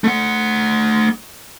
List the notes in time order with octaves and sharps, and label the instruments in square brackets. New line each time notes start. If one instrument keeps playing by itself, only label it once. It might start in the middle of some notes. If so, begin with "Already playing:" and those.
[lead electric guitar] A3 F#5